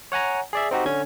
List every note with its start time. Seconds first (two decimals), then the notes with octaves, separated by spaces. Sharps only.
0.12 C#5 F#5 G#5 A#5
0.53 G#4 D5 E5
0.71 C4 D#4 F#4 G4
0.86 D3 C#4 G#6